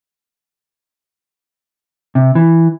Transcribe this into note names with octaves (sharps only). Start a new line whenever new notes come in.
C3
E3